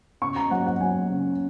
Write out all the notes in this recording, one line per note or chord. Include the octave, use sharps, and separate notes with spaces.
C#3 C#6
A#5
F#3 F#5
F#5
F#3 G#5
C#3